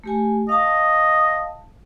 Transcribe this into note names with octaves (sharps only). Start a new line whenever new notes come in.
A3 G4 G#5
D#5 F5 A5